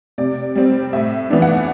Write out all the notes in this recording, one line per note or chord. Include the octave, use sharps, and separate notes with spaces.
C3 D5
G3 C4
A2 E5
E3 B3 D4
F#5